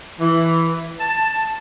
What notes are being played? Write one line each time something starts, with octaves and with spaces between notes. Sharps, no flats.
E3
A5